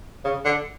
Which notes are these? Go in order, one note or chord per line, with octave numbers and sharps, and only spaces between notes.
C#3
D3